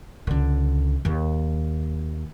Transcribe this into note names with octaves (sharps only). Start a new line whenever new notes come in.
C#2 D3
D#2